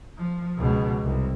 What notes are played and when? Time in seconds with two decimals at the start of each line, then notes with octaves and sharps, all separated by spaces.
0.17 F3
0.58 C#2 B2
1.04 C2